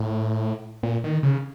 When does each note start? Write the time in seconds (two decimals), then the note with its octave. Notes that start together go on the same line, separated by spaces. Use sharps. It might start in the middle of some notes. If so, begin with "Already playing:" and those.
Already playing: A2
0.83 A#2
1.04 D#3
1.23 C#3